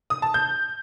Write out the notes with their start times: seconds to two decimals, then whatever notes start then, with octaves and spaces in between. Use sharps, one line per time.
0.10 D#6
0.22 A5
0.34 G6